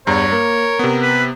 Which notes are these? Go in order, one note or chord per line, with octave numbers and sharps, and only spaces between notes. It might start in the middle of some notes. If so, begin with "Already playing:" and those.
E2 G2 C#5 A#5
A#3 A#4
C3 B3
B4